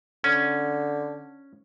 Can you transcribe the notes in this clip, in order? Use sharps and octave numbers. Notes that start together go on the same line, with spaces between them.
D3 C#4